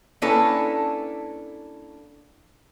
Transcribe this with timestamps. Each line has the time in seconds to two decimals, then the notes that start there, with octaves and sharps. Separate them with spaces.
0.22 A#3 C#4 D4 E4 A4 B4